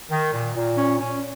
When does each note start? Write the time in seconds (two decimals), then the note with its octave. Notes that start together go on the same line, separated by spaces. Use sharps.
0.11 D#3
0.34 A#2
0.56 A#2
0.78 C#4
0.99 C#4